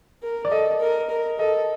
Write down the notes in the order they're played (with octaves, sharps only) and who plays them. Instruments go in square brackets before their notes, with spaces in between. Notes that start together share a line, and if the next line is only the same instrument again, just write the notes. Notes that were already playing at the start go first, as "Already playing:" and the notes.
[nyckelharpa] A#4
[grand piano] D5
[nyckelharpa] A4 [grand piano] D#5
[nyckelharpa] A#4
A#4
[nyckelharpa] A4 [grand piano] D#5